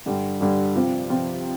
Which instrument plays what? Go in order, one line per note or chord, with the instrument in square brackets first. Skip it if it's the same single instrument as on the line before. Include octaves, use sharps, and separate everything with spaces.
[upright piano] G2 D3 G3
G2 D3 G3
C3 F3 C4 F4
C3 F3 C4 F4